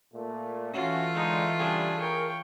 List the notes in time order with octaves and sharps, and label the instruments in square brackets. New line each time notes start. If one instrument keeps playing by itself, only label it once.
[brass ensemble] A#2 A3
[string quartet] E3 A3 F4 [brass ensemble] C#4 F#4
[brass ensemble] D3 G#3 [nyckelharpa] D#4
[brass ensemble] C#3 G3 [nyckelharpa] D4 G#4
[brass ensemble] G#4 A#4 [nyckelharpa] C#5 G5